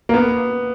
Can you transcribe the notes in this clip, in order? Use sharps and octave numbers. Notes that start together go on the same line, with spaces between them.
A#3
B3